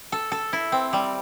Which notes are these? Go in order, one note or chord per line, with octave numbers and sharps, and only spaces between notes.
A4
A4
E4
C4
G3